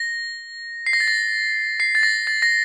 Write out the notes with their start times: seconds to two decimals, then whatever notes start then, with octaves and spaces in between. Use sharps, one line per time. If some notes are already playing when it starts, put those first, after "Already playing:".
Already playing: A#6
0.86 C7
0.93 A#6
1.00 A6
1.08 A#6
1.80 C7
1.95 A6
2.03 A#6
2.27 A6
2.42 A#6